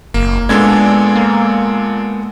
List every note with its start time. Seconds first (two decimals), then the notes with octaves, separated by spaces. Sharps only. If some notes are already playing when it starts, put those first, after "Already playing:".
0.14 F#1 A#3
0.49 A#2 G#3 B3 D4 A4 G#6
1.15 A#3